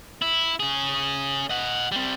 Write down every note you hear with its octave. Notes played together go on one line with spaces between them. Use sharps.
E4
C#4 G#4
D#5 F#5
G3 C4